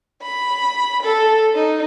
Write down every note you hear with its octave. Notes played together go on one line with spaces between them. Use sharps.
B5
A4
D#4